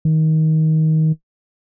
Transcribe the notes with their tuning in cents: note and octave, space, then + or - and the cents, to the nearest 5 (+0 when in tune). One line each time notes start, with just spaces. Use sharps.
D#3 +20